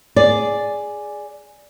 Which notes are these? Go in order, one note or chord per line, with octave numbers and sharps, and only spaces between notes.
G#4 D5